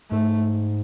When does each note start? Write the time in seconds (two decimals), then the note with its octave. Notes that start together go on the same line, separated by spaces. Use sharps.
0.11 G#2 A3